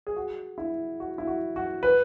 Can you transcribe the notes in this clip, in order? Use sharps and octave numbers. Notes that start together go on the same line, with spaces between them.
G#4
F#4
E4
F#4
E4
F#4
F#4
B4